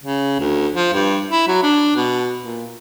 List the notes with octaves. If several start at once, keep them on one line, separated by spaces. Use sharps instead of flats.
C#3
D2
F3
G2
E4
F#3
D4
B2
A#2